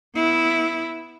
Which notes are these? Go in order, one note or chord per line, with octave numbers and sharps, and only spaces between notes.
B3 E4